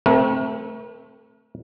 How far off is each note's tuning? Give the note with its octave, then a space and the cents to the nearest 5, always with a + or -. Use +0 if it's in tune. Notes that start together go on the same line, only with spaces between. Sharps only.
A3 +0 C4 +0 A#4 +40